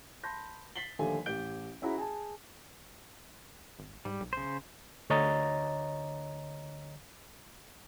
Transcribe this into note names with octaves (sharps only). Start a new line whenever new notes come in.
A5 B5 C6 G6 A#6
A6 B6 C7 F#7 G7
D#2 D3 F3 G3 A3 G#5
A1 G4 G6 D7 G7
C#4 E4 F#4 G#4 A#5 B5
G#4 G#5 A5
G#1
G#2 G3
B1
C#3 C5
D2 D3 C#5 D#5 A#5 A6